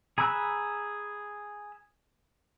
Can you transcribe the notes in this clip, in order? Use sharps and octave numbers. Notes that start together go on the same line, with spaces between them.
G#4 A#5 B5 E6 F#6